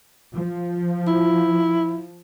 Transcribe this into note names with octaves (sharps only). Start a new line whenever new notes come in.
F3
E4